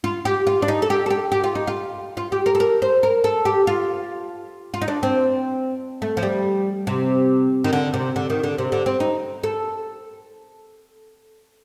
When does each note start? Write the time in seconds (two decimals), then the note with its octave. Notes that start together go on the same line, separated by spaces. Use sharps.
0.04 F4
0.25 G4
0.47 F4
0.62 D4
0.68 D#4
0.82 A4
0.90 G4
1.06 A4
1.10 G4
1.32 G4
1.44 F4
1.55 D#4
1.67 F4
2.17 F4
2.32 G4
2.46 A#4
2.55 A4
2.60 A#4
2.82 C5
3.03 A#4
3.24 A4
3.45 G4
3.67 F4
4.74 F4
4.81 D#4
4.88 D4
5.03 C4
6.02 A3
6.17 F3
6.23 G3
6.87 C3
7.64 D#3
7.73 D3
7.94 C3
8.16 D3
8.30 D#3
8.43 D3
8.58 C3
8.72 D3
8.86 C4
9.00 D#4
9.43 A4